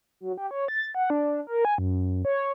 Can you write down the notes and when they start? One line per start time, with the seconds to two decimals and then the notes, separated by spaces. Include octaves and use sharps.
0.20 F#3
0.38 G4
0.51 C#5
0.68 A6
0.95 F#5
1.10 D4
1.47 A#4
1.65 G#5
1.78 F#2
2.25 C#5